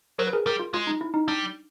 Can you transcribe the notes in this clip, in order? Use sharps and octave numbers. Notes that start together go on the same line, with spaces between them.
F#3 A#4 C5
B4
G#4 A#4
G3 G#4 A#4
F4
G#3 F4
D#4
E4
D#4
G3 D4